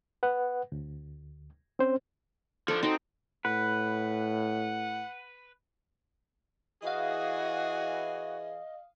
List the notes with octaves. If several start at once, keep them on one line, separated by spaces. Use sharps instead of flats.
B4 F#5
D2
C4 C#4 C5
F3 D4 A4
C4 D#4 F#4
A2 B4 F#5
E3 F#4 G#4 D#5 F5 D#6